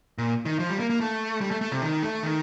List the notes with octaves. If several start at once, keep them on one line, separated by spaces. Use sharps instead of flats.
A#2
D#3
F3
G3
A#3
A#3
A3
G3
A3
A3
C3
D#3
A3
D#3